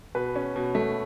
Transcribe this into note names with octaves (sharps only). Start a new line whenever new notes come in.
B2 B4
C#4
B2
A3